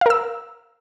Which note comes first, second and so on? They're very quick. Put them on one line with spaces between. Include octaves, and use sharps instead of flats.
F5 A#4 E6